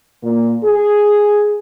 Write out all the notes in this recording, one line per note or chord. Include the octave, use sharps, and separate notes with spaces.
A#2
G#4